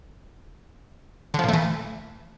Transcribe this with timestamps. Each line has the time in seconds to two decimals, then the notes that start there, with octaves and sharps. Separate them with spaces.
1.34 D3
1.39 F3
1.44 A#2
1.49 A3
1.53 E3